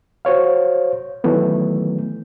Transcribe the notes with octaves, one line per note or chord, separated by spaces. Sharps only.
F#4 C5 C#5 F5
D#3 E3 F#3 A3 B3